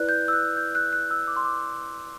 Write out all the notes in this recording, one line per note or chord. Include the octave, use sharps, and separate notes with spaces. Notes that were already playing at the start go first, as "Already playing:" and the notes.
Already playing: E4 B4 D5 F#6
G6
E6
F#6
G6
F#6
F#6
E6
D6
C6
D6